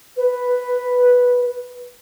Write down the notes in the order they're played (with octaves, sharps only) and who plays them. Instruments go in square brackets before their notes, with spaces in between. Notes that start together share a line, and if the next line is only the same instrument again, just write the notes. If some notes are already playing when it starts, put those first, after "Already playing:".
[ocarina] B4